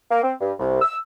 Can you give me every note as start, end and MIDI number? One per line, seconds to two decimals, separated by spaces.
0.11 0.23 58
0.23 0.33 60
0.40 0.53 43
0.59 0.79 36
0.81 0.97 88